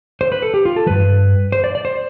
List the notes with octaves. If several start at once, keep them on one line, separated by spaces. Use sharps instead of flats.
C5
B4
A4
G4
F4
A4
G2 F3 B4
C5
D5
D5
C5